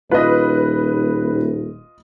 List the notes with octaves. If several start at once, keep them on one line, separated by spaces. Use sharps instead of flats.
D#1 F4 B4 D#5